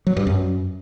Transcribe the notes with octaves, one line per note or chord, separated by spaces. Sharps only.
F#3
G2
F#2